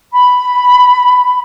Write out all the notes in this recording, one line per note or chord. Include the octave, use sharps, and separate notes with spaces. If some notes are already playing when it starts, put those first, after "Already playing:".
B5